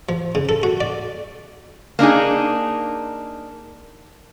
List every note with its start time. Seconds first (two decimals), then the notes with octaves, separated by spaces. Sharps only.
0.09 F3
0.35 C#3
0.49 A4
0.63 F#4
0.81 D5
1.99 A#3 D4 D#4 G#4